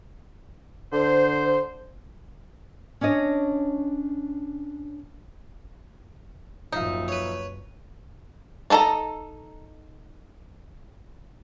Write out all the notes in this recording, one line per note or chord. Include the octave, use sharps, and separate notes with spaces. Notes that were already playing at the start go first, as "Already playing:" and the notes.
D3 C5
C#4 D4 C#5 D#5
F#1 A#2 F3 D#4 E5 F5
B4 C#5
D4 D#4 A4 D#5 A#5